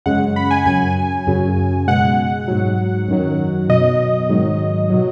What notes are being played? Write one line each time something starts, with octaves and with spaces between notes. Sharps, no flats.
F#2 C#3 G#3 F#5
B5
G#5
F#2 F#3 G#5
F#2 C#3 F#3
B2 G#3 F#5
G#2 F#3
F#2 D#3 F#3
B2 F#3 D#5
G#2 D#3 F#3
B2 F#3